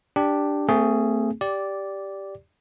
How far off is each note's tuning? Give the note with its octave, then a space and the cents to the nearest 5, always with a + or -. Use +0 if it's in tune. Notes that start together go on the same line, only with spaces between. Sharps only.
D4 +0 G4 +5
A3 +30 C4 -20 G#4 +5
G4 +0 D5 -10